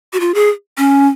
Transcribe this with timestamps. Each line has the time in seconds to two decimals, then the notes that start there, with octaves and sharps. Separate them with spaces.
0.13 F#4
0.20 F4
0.34 G#4
0.78 C#4